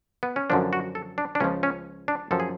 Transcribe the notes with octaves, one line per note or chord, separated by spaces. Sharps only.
B3
C#4
F#2 D3 F3 D4
F#4
A4
D4
D4
C#2 C#3 F3 C#4
C#4
D4
F#2 F3 A4
G#4